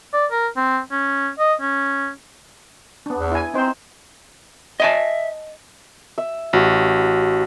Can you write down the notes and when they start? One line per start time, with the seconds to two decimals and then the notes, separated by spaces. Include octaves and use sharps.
0.14 D5
0.31 A#4
0.56 C4
0.91 C#4
1.39 D#5
1.61 C#4
3.06 B3 D4
3.18 E2
3.32 E4 G#5
3.54 C4 D#4 C5
4.80 D#5 E5 G#5 A5
6.18 E5
6.53 A1 F#4 G4